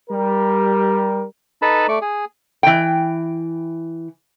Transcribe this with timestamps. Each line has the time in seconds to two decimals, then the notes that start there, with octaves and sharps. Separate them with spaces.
0.10 G3 A#4
1.62 D#4 A4 B4 A5 B5
1.89 A3 D5 C#6
2.01 G#4
2.63 E3 G5